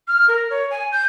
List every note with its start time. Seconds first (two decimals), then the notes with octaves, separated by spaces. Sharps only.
0.08 F6
0.28 A#4
0.50 C#5
0.71 G#5
0.92 G6